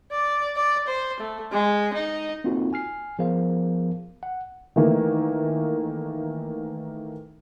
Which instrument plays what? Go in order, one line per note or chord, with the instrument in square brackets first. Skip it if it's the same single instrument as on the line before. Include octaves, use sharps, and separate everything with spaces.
[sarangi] D5
D5
C5
A3
G#3
D#4
[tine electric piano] A#3 C4 D#4 F4 F#4 A4
G#5 F6 C7
F3 B3 G#4 A#4 C5 F5
F#5
[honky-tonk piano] D#3 E3 A3 A#3